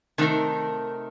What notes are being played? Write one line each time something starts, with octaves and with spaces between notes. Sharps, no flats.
C3 D#3 A3 D#4 A#4